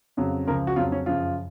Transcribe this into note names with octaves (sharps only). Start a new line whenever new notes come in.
F2 C#3 F#3
C#2 C#3 F3 A#4
F#4
F2 C#3 F#3 F4
C#4
F#2 C#3 F3 F4